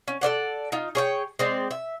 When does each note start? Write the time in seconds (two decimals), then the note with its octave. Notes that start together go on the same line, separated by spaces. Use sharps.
0.08 C#4
0.21 A4 C5 D5 F#5
0.72 D#4 F4
0.95 G#4 C#5 G5
1.39 G#3 C4 D5
1.71 E5